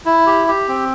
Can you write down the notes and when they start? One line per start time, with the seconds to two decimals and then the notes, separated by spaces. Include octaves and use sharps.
0.06 E4
0.27 G4
0.48 G4
0.68 C4